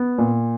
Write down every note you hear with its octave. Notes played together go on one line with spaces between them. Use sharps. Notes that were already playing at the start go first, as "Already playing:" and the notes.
Already playing: B3
A#2